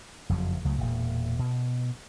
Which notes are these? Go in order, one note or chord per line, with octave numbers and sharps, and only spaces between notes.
F#1 F2 F3 F#3
C#2 C#3 F#3 A3
E1 A#2
B2